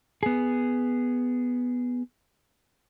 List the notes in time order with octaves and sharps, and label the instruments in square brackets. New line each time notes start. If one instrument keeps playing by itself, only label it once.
[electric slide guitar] B3 G#4